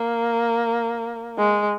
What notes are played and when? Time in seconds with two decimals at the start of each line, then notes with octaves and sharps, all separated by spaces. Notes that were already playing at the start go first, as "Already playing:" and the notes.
Already playing: A#3
1.38 G#3